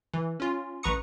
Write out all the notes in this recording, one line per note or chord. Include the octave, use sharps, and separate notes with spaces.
E3
C#4 F4
A1 B4 A#5 C#6 D#6 C#7